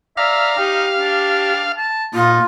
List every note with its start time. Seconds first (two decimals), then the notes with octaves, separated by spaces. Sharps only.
0.17 D5 E5 F5 A#5
0.58 D#4 G4
0.98 D4
1.77 A5
2.14 A#2 D#4 F4